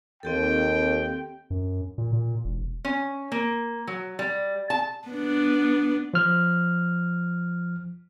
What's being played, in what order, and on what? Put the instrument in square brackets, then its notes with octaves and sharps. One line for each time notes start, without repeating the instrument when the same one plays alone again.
[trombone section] D#2 [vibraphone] C4 G4 A4 [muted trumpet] G5
[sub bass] F#2
A#2
A#2
E1
[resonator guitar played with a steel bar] C#4
A#3
F#3
G3
A5
[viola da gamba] B3 D4
[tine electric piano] F3 F6